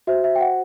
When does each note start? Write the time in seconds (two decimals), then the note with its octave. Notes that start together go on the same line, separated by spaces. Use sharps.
0.07 F#4 C5 E5
0.24 E5
0.36 G5
0.41 F#5